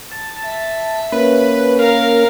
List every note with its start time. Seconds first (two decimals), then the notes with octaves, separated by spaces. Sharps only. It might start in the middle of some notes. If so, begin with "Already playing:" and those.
0.12 A5
0.45 E5
1.12 A#3 C#4 B4
1.79 A#4 F5